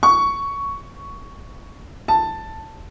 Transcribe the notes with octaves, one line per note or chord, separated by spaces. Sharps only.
C#6
A5